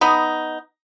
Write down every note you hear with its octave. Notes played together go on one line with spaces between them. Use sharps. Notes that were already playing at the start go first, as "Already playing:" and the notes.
B3 D#4